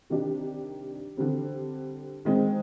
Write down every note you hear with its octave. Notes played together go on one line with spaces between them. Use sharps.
C3 D#3 G3 D4 G4
D3 G3 C4
D#3 G#3 C4